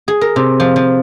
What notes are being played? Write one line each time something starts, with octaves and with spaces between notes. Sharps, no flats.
G#4
A#4
C3
F3
F3